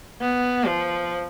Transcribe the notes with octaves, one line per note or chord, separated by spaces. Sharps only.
B3
F3